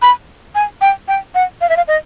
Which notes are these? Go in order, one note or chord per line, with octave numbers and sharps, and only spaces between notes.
B5
G#5
G5
G5
F#5
F5
E5
F5
D#5